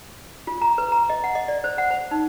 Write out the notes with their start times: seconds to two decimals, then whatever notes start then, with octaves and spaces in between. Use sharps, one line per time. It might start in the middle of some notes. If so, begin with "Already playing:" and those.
0.47 F4
0.62 A#5
0.78 B4
0.92 A#5
1.10 D#5
1.24 F#5
1.35 D#5
1.48 D5
1.64 C5
1.78 F#5
1.90 C5
2.11 D#4